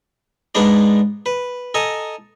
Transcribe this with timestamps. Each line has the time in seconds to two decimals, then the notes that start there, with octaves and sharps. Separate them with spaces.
0.55 G#2 G#3 B3 D4 D5
1.26 B4
1.74 A4 D#5 G#5 A#5